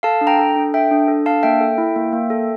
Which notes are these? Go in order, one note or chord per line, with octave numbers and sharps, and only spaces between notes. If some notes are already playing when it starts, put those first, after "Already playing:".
A4 F5 A5
D4
G5 A#5
A4
D4
A4 E5 G5
D4
A4
D4 F5 A5
A#3 E5 G5
A4
E4
A#3
A#3
A4